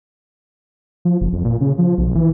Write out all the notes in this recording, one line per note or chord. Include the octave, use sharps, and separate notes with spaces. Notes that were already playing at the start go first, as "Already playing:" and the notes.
F3
F#1
F2
A#2
C#3
F3
B1
E3